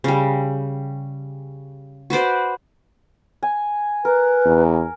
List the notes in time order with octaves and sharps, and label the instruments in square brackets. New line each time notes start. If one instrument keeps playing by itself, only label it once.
[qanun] C#3 G3
F#4 B4 C5 D5
[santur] G#5
[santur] A#4 [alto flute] B4
[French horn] E2